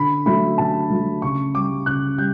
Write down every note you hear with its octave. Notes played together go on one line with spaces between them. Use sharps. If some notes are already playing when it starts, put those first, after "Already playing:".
Already playing: D3 B5
F#3 A3 B5
D3 A5
F#3 A3
C#3 C#6
G3 D6
C#3 F#6
G3 G6